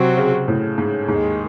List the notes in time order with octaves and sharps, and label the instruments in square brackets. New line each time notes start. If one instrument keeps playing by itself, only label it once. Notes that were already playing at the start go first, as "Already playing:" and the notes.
Already playing: [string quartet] C3 F#3 C4 F#4
[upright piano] C#3
A2
G#2
[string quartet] D#2 D#3 G#3 [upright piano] G#2